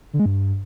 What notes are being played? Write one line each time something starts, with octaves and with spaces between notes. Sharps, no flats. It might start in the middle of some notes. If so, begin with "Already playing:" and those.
D3
G#3
G2